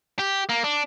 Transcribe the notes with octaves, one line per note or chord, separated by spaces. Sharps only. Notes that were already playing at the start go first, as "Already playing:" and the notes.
G4
A#3
D4